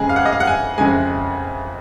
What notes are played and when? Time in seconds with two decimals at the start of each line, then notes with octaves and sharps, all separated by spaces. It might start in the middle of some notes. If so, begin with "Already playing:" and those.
Already playing: F2 C#3 G#3 G#4
0.09 F5
0.16 F#5
0.25 D#5
0.32 F5
0.40 F#5
0.47 G#5
0.78 F2 C#3 G#3 G#5